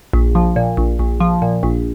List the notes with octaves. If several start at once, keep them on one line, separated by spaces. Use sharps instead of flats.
A#1
F3
A#2
A#1
A#1
F3
A#2
A#1